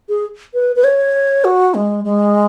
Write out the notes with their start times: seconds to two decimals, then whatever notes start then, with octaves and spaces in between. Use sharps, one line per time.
0.09 G#4
0.54 B4
0.76 B4
0.84 C#5
1.44 F#4
1.74 G#3
2.04 G#3